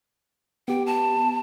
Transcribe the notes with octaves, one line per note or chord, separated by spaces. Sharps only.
B3 G4 G5
A5